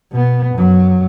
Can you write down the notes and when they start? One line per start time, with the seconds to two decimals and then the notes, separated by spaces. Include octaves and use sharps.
0.11 B2 B3
0.55 F#2 F#3